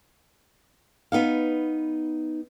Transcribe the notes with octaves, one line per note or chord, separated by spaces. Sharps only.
B3 D#4 F5